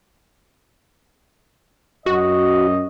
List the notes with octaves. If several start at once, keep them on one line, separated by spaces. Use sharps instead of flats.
F#2 F#4 D#5